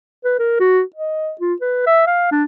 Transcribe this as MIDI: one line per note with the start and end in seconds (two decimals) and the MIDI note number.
0.25 0.35 71
0.39 0.57 70
0.60 0.81 66
0.96 1.32 75
1.41 1.54 65
1.61 1.85 71
1.87 2.06 76
2.07 2.27 77
2.31 2.44 62